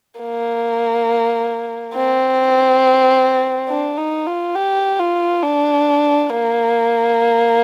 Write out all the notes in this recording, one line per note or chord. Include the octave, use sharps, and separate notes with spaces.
A#3
C4
D4
D#4
F4
G4
F4
D4
A#3